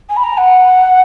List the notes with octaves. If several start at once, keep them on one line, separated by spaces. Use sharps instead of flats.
G#5
B5
A#5
F#5